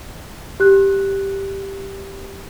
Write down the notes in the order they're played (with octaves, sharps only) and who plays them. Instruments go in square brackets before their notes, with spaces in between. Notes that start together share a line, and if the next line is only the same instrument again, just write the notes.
[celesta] G4 F#6